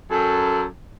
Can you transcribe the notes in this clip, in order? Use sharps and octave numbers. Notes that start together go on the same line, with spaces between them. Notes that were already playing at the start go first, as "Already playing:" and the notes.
F#2 A4